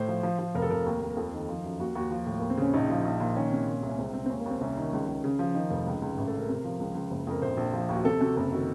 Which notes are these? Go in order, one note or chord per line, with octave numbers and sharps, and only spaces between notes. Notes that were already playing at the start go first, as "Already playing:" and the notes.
Already playing: A2 C5
F3
F3
F3
F1 A#4
A4
F1 A#4
D#2
D#2
A#4
F2 A4
D#3
F3
F#2
D#2 F#4
D#2 F#4
F3
A2
D#2 A#3
C4
C#3 C#4
A#1 D#4
F3
A#1
A#2
D#3 C#4
C3
A#2
C2
C#4
C#2 C4
C#2 C4
C4
D#2 C#4
A#3
D#2 C4
C2 C#4
D#3
C#2
C#2
C#3
F3
D#3 D#4
F1
C#2
C#2
A1
A4
A2
A#4
C3
F3
C#2
C#2
F#1
F2 A#4
A#1 C5
A#1
F3
D#2
F#4
C3 A4
C3 F#4
F#1 A4
D#3 F#4